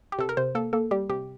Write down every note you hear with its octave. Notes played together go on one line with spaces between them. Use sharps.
G4
C3 A4
A#4
C3 C5
A#3 A4
A#3 A4
G3 G4
C3 G4